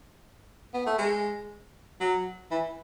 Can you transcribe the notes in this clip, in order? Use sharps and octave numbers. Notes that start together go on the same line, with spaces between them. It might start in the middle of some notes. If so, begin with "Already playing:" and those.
B3
A3
G#3
F#3
E3